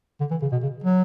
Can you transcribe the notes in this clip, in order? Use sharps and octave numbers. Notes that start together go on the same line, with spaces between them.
D3
E3
C#3
B2
C#3
F#3